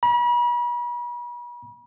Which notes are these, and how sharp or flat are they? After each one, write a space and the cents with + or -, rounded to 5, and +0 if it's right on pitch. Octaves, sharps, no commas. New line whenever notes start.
B5 -40